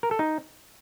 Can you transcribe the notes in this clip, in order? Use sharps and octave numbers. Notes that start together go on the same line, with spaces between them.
A#4
A4
D#4